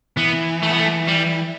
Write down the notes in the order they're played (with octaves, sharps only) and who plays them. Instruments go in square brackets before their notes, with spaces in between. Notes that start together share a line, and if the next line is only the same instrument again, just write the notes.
[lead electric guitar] E3 [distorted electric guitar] B3
[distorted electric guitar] A3
B3
A3
G3